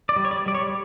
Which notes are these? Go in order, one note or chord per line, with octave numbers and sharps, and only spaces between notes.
D5
G3
C#5
D5
G3 D5
C#5